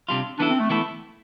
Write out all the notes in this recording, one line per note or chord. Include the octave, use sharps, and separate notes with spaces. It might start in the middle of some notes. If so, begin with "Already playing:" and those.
C3 G3 D4 F4
E3 B3 D4 E4 A4
C4
A3
E3 A3 B3 E4 A4